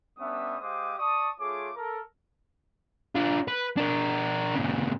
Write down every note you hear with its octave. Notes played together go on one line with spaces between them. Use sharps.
G3 B3 C#4 D4 E5 D#6
G#3 G4 C5 F5 D6 D#6
D5 A5 C#6 D#6
A3 F4 G#4 C#5 D6
A4 A#4
D4 F4
B4
D4 A#4
A#2 C#3